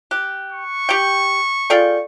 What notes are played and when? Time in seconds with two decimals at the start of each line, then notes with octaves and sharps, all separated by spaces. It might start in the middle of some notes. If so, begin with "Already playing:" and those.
0.11 G4 F#6
0.52 C#6
0.89 G4 G5
1.70 F4 G#4 A4 D5 F5 G5